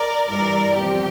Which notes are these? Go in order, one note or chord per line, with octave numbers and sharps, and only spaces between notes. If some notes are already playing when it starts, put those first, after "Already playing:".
Already playing: A#4 D5
G2 E3 G3 A#4 D5
E2 C3 F3 G4